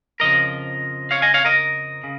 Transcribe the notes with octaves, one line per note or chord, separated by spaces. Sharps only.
F2 C#3 F3 A#4 D#5
C#5 F5
D#5 G#5
C#5 F5
A#4 D#5
C#3